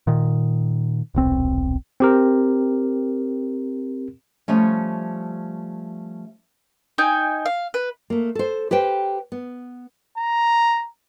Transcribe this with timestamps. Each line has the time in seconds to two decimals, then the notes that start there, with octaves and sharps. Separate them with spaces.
0.07 A#2 D#3
1.15 D#1 B1 C4
2.00 C4 G4 A#4
4.48 F3 G3 A3 C#4
6.98 D#4 G5 G#5
7.46 F5
7.74 B4
8.10 A3 A#3
8.35 A4 C5
8.71 G4 B4 C5 G5
9.32 B3
10.17 A#5